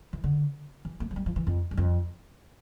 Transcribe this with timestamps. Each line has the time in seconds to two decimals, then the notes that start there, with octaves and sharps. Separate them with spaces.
0.13 E3
0.24 D3
0.85 E3
1.00 A3
1.11 F3
1.16 G3
1.26 F3
1.36 E3
1.47 F2
1.71 G2
1.77 F2